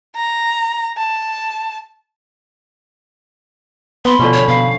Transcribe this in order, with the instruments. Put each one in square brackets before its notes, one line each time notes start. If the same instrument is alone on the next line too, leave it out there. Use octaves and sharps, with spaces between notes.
[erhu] A#5
A5
[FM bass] B3 [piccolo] B5 [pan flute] C6
[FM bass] B2 [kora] D3 F3 C#4
[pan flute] C#5
[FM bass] B2 [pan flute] F5